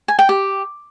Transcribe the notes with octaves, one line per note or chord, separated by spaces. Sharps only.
G#5
G5
G4